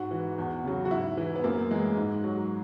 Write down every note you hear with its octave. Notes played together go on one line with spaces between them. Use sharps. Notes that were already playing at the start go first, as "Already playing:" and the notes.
Already playing: G#2 F#4
E3
E2
C#3 F#3
F#4
G#2 E4
E3
B3
F#2 A#3
E3 G#3
G#2
F#3